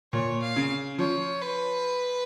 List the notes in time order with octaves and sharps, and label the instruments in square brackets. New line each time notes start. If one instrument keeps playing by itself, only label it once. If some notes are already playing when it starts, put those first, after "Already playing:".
[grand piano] A#2 [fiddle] C#5
[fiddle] F5
[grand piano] C#3
[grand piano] F3 [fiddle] C#5
[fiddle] B4